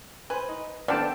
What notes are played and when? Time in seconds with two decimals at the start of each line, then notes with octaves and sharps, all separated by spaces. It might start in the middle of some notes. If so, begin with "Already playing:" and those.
0.30 B4 C5 G#5
0.49 D#4
0.88 D3 B3 C4 D5 F5 G5 A5